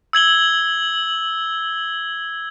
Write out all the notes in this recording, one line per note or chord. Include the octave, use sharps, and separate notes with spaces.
E6 G#6 F#7 G7